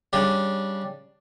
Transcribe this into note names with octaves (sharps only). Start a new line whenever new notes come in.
C#3 G3 D4